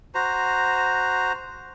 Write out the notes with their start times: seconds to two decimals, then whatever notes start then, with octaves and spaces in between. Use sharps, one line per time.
0.15 F#4 C5 A#5